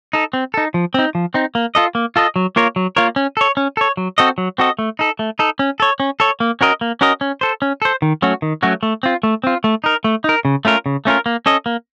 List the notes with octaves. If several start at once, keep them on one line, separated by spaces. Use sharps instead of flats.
D#4 A4
C4
D#4 A4
F3
C4 D#4
F3
C4 D#4
A#3
F4 A4 D#5
A#3
F4 A4 D#5
F#3
A#3 F4 A#4 C#5
F#3
A#3 F4 A#4 C#5
C#4
A4 C#5
C#4
A4 C#5
F#3
C4 F#4 A4 D#5
F#3
C4 F#4 A4 D#5
A3
D#4 A4
A3
D#4 A4
C#4
A4 C#5
C#4
A4 C#5
A#3
C#4 F#4 A#4 D#5
A#3
C#4 F#4 A#4 D#5
C#4
A4 C5
C#4
A4 C5
D#3
F#3 A3 C#4 F#4
D#3
F#3 A3 C#4 F#4
A3
C4 F4
A3
C4 F4
A3
D#4 A#4
A3
D#4 A#4
C#3
A3 C#4 F4 A#4
C#3
A3 C#4 F4 A#4
A#3
C#4 A4 D#5
A#3